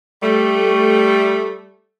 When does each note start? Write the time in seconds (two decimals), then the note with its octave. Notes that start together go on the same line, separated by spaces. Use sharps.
0.23 G3 A3